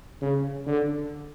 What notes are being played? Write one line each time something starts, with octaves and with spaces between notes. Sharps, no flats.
C#3
D3